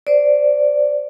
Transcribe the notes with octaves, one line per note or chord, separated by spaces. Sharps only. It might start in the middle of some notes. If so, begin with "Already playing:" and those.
C5 D5